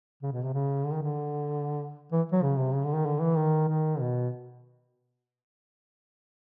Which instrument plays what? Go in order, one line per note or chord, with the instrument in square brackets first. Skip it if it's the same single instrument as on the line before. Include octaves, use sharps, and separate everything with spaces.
[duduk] C#3
B2
C3
C#3
D3
D#3
D3
E3
F#3
C#3
C3
C#3
D3
D#3
D3
E3
D#3
D#3
B2